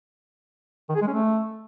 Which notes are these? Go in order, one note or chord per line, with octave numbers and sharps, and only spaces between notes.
D#3
G#4
G#3
C#4
A3